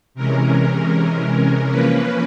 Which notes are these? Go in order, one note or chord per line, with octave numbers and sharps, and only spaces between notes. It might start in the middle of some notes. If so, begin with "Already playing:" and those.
C3 E3 G#3 C#4 A#4
F3 A#3 C#4 B4